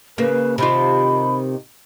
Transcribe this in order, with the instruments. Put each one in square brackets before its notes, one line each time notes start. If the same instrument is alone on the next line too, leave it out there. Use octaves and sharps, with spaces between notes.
[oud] C#3 A#3 [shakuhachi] B4
[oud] C3 D#3 F4 [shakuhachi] B5